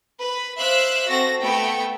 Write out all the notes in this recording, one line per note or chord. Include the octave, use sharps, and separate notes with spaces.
B4
C5 E5 F5 D6 E6 F#6
C4 F#4 A4 A#6
A3 B3 G5 C#7